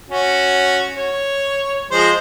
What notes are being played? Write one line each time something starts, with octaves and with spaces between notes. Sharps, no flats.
C#4 F#4
C#5
F3 G#3 C5